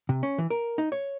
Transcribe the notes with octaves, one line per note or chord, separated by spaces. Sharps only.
C3
C#4
E3
A#4
D#4
C#5